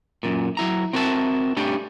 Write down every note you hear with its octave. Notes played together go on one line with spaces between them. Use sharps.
F#2 A#2
F#3 E4 A#5
C4 F#4 A#4 E5 A5
G3 A3 C#4 D4 G4